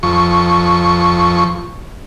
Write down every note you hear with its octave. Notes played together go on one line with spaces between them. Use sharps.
F2 C#6